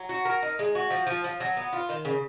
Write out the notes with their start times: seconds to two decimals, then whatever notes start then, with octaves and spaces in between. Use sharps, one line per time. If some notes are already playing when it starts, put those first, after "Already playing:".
Already playing: F#3
0.09 F#4
0.25 A#4
0.43 D#4
0.59 G#3
0.75 F#4
0.90 F3
1.07 F3
1.24 F3
1.40 F#3
1.57 B3
1.73 F4
1.89 D#3
2.05 C#3